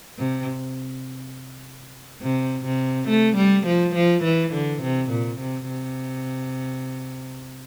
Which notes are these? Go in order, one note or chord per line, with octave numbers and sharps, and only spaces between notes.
C3
C3
C3
A3
G3
F3
F3
E3
D3
C3
A#2
C3
C3